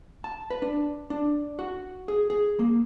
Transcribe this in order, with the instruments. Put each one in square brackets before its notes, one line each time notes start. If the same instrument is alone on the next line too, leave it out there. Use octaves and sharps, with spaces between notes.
[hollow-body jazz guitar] A5
B4
D4
D4
F#4
G#4
G#4
A#3